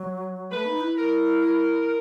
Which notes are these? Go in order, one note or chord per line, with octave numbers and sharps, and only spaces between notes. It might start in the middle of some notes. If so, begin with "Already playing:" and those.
Already playing: F#3
A3 B4
D#4
E4
A#4
A#4